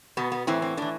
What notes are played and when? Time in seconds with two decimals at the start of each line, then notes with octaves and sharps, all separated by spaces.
0.17 B2 B3
0.32 B3
0.47 A2 E3 C4
0.62 C4
0.77 A2 E3 D4